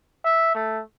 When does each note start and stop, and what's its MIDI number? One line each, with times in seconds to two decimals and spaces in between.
0.24 0.52 76
0.55 0.81 57